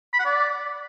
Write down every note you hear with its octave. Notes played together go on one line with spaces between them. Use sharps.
B5
F#5
D5